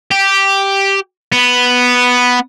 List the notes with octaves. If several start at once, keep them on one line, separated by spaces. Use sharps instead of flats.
G4
B3